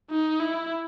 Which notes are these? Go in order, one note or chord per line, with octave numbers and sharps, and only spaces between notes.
D#4
E4